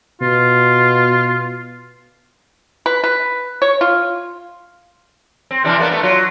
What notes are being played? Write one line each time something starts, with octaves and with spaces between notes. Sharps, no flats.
B2 F4
B4
B4
C#5
F4
C4
C3 E3 D4
A#3 B3 D4
A3 B3
F#3 F4